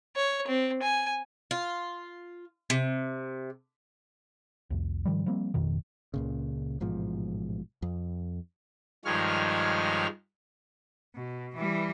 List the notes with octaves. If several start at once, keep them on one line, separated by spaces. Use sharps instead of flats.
C#5
C4
G#5
F4
C3
C2 F2
G#2 D#3 F3 G3
F3 G3 A#3 C4
G#1 F2 B2 D#3
C#2 A#2 C#3
A1 G#2 B2 F3
F2
G2 D#3 F3 G#3 C#5 F6
B2
E3 G3